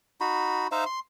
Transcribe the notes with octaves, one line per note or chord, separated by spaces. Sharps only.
D#4 F#4 B5
D#4 C5 E5 F5
C6